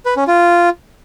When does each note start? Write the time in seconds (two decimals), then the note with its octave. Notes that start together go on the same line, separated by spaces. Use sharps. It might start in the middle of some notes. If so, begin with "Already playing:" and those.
0.06 B4
0.17 C#4
0.28 F4